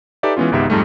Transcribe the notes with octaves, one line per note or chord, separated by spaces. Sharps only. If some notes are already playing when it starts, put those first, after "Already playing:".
D#4 G4 A4 B4 D5 E5
E3 G#3 B3 C#4 F4
G#1 C#2 G#2 B3 G4 E5
F2 G#2 G3 A3